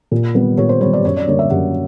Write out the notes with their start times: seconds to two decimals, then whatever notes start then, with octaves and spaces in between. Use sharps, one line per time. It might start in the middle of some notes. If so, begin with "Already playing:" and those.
0.11 A#2
0.34 G3 B3
0.58 A#2 C#5
0.69 C5
0.81 G3 C#5
0.86 B3
0.93 D5
1.05 F#2 C#5
1.17 D5
1.27 D3 G3 A#3 C#5
1.39 E5
1.50 F#2 F#5